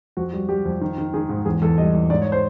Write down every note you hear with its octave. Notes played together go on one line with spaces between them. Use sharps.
F2 F#4
G3 F#4
G3 G4
F2
D#3
D#3
D#3 G#4
G#2
E2 G#4
E2 A4
G3 D#5
E2
G#2 D5
C#5
C5